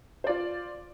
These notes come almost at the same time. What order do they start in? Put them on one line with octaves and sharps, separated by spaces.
C5 D5 F4